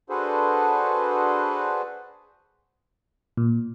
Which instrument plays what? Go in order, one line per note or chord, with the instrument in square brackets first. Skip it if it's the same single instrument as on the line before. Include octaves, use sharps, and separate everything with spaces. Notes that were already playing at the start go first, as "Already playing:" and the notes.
[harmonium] D4 F#4 G#4 A4 B4 C5
[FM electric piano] A#2